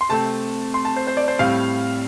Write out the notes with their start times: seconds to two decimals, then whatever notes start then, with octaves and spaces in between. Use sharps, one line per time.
0.01 C6
0.09 C3 A3 C4 A5
0.74 C6
0.85 A5
0.96 C5
1.07 C5
1.17 D5
1.28 C5
1.39 A2 G3 C4 F5